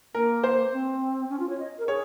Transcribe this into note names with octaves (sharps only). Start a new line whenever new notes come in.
A#3 A#4
C5
C4
C#4
F4
C#5
D#5
A#4
G#4 C#5